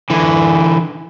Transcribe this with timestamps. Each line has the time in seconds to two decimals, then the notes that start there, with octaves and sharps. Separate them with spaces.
0.10 D3 E3